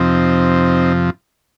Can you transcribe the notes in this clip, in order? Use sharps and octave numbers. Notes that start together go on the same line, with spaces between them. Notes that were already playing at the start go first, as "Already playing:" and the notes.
Already playing: F2 C3 F3 C4 D#4